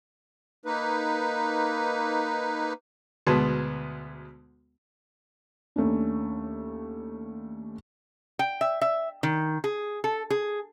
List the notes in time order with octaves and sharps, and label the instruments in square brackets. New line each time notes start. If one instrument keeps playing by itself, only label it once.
[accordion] A#3 D#4 B4
[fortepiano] D2 B2 G#3 B3 A5 C6
[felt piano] D#2 A3 C#4 D4
[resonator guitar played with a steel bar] G5
E5
E5
D#3
G#4
A4
G#4